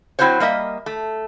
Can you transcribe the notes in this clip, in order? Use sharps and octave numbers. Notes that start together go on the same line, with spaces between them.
F#3 C4 E4 F#4 C5 C#5
G3 A#3 D#5 E5
A3